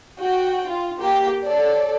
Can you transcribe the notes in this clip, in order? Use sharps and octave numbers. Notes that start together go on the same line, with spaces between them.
F#4 G5
F4
A#3 G4 G5
A4 C#5 D5